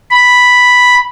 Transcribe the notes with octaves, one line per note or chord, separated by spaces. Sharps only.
B5